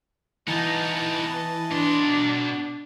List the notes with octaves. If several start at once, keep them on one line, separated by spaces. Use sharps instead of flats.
E3 B3 D#4 D#5 A5
B2 D4 C6